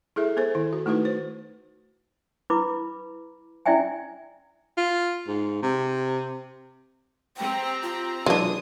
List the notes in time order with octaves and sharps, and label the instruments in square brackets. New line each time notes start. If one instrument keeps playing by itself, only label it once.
[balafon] E4 G#4 A4 E5
B3 A4 C5
D#3 E4
F#4
A3 D#4 E4 F#4 B4
C5
[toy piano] E4 B4 B5 D6
C#4 E4 D5 E5 G5 G#5
[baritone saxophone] F4
G#2
C3
[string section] C4 G4 A#5 [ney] G5
[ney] F4
[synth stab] B2 E3 F#3 [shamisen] G#3 D4 [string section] D#6